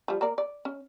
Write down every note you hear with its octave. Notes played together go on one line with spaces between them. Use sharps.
F3 G3
A#3 A#4 D5
D5
C#4